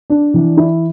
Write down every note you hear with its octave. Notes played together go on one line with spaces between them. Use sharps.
D4
E3
E4